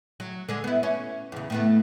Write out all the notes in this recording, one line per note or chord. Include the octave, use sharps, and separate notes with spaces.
F#3
D3 G#3
B3 E4
C#4
E2 C#3
A2 A3 B3